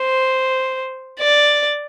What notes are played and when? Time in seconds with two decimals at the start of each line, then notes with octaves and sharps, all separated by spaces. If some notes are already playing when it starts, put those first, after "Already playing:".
Already playing: C5
1.20 D5